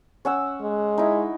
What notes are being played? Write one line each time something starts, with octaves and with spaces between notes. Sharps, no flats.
C#4 F#5 E6
G#3
D#4 E4